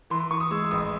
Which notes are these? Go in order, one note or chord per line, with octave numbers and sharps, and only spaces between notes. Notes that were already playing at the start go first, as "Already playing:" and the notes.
E3 C6
C6
E3 C#6
D#6
G#3 E6
E6
A1 D#6